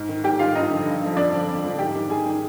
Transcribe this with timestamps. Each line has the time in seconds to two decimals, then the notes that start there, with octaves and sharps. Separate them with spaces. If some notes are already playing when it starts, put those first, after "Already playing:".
Already playing: G#2
0.09 D#3
0.24 G#2 G4 G5
0.39 D#3 F4 F5
0.55 G2 D#4 D#5
0.70 D3 F3
0.86 G2
1.02 D3 F3
1.17 F2 D4 D5
1.32 D3 F3
1.48 F2
1.64 D3 F3
1.79 G#2 G4 G5
1.95 D#3
2.10 G#2 G#4 G#5
2.26 D#3